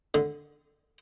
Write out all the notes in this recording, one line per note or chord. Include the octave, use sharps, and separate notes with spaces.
D3